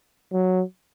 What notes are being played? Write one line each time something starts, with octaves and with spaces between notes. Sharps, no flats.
F#3